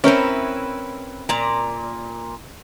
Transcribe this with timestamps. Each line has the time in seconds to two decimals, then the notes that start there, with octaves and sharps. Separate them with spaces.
0.04 C4 C#4 E4 A#4 B4 C#5
1.29 A#2 D5 A#5